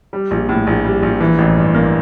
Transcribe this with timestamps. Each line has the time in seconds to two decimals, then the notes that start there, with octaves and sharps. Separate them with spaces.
0.13 G3
0.31 A#1
0.49 A2
0.67 A#1
0.84 G3
1.03 A#1
1.20 E3
1.38 A1
1.57 G2
1.74 A#3